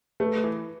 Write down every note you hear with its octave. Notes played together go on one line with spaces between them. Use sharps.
A3 B4
E3